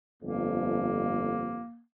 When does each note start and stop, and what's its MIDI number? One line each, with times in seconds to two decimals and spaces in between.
0.23 1.60 31
0.23 1.60 41
0.23 1.81 58